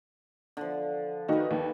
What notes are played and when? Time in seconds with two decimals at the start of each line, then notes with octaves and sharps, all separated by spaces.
0.57 D3 F3
1.28 D#3 D#4 F#4 G4 B4
1.51 D#2